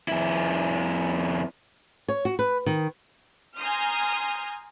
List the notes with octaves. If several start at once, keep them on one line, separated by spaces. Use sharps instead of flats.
F2 E4
C#5
F#4
B4
D#3
G#5 A#5 C6 D#6 F6 G6